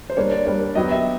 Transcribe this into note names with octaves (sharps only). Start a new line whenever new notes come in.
C5
G3 A#3 D4 C#5
D5
G3 A#3 D4
F#3 B3 D#4 G4 D#5
E5